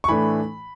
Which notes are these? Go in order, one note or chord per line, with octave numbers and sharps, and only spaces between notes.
C#6
A2 E3 A3 D4 B5